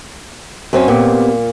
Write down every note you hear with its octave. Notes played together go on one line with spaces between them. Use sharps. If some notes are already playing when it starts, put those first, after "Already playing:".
F#2 C4 C#4
A#2 B3 C4 G4